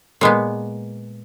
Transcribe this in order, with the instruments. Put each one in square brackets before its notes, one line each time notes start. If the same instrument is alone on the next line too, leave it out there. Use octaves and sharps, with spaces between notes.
[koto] A#2 G#3 B3